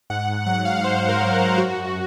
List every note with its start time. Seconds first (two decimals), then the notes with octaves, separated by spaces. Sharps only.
0.10 G#2 F#5
0.46 F#3 F#5
0.65 F5
0.83 G#2 C5
1.08 A#4
1.21 F#3
1.33 A#4
1.58 F#2 F#4